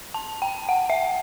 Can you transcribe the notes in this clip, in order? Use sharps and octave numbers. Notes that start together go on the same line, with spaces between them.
A5
G5
F#5
E5